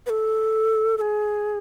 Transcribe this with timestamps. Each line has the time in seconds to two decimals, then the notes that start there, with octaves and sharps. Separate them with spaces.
0.06 B4
0.10 A4
0.98 A4
1.01 G#4